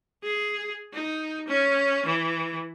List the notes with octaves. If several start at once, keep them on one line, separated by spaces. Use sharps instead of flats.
G#4
D#4
C#4
E3